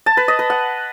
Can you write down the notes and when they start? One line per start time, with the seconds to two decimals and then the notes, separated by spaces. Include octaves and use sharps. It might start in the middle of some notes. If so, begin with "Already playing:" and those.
0.06 A5
0.17 B4
0.28 D#5
0.39 B4
0.50 F#5